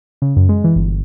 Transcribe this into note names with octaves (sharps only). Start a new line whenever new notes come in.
C#3
F#2
G#3
E3
G1